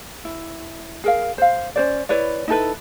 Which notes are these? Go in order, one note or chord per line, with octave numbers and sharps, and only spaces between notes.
E4
G#4 A#4 F5
C5 F5
C#4 C5 D5
E4 B4 C#5 D5
D#4 E4 A4 B4